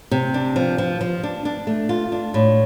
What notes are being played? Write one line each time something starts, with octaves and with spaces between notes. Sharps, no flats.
C3
D4
F3
F3
F3
D4
D4
A3
F4
D4
A2